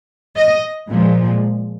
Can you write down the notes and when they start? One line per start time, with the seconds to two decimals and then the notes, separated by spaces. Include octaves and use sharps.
0.36 D#5
0.89 A#2 F3 G#3